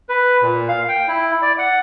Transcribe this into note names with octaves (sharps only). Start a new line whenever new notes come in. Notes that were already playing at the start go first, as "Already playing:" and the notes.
B4
A#2
F5
G5
E4
D5
F#5